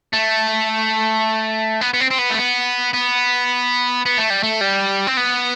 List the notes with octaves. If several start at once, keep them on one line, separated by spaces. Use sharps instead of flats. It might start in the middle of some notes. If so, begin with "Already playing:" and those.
A3
B3
B3
C4
C4
B3
A3
B3
B3
B3
A3
G3
A3
G3
C4
B3